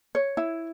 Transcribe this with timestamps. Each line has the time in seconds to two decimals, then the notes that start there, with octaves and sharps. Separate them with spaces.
0.15 C#5
0.37 E4